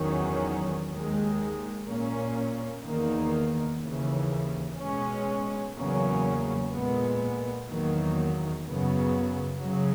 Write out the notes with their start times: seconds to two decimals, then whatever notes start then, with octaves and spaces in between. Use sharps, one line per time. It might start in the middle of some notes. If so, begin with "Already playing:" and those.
Already playing: E2 D#3 F#3 C#4
0.90 D#2 D#3 G#3
1.87 A#2 A#3 C#4
2.83 E2 D#3 A#3
3.81 D#2 C#3 E3
4.78 B2 G#3 C#4
5.75 E2 C#3 F#3 A#3 C#4
6.72 A#2 G#3 B3
7.69 E2 D#3 F#3 A#3
8.66 F#2 C#3 F#3 B3
9.62 C#3 F#3